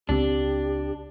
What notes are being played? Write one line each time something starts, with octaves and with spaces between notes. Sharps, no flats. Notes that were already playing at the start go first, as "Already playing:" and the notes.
C#2 C4 D4 G4